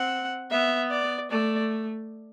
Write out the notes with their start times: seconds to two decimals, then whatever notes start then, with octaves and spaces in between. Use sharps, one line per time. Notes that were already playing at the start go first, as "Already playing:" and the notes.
Already playing: C4 F#5
0.50 B3 E5
0.91 D5
1.31 A3 D5